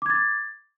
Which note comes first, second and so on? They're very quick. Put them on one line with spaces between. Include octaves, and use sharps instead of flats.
D6 G#6 A6